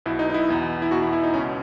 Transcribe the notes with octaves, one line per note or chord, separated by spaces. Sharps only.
B1 B2 E4
D#4
D#4
E4
E2 B2
E4
E2 B2 F#4
E4
E4
D#4
C#2 B2 C#4